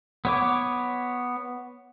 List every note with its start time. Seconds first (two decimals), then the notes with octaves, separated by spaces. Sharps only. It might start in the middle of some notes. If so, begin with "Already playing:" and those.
0.25 B3 C#5 D6